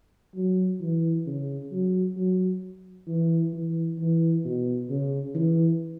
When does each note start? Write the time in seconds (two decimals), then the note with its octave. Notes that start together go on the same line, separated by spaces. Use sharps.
0.35 F#3
0.81 E3
1.27 C#3
1.72 F#3
2.17 F#3
3.07 E3
3.53 E3
3.99 E3
4.45 B2
4.90 C#3
5.35 E3